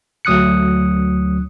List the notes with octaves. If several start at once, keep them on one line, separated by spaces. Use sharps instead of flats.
D2 F#3 D#6 F#6 C#7